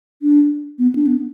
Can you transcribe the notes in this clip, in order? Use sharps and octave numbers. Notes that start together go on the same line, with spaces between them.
D4
B3
D4
B3